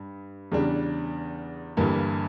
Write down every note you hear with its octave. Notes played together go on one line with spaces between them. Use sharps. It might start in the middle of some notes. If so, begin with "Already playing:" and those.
Already playing: G2
E2 C#3 G3 D4
G1 G2 E3 A#3